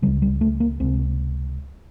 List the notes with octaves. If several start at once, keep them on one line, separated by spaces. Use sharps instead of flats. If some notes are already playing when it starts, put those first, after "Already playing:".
C#2 C#3 G3
G3
A3
A#3
C#2 C3 C4